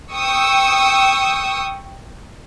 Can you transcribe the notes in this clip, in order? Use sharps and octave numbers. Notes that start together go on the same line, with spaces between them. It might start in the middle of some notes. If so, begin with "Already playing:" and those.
G5 C#6 D#6 E6